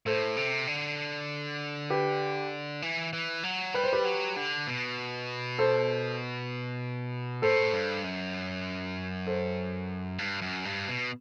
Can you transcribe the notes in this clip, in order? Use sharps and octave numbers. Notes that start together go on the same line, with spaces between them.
A2 A4 C5
C3
D3
G4 B4
E3
E3
F#3
G3 B4
C5
G4 B4
F#3
D3
B2
A4 C5
A2 A4 C5
G2
F#2
A4 C5
G2
F#2
G2
B2